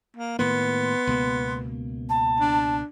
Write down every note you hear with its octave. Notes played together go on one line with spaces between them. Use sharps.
A#3
A2 D#3 A#3 B3 C6
C#2 B2 A#3
A5
D4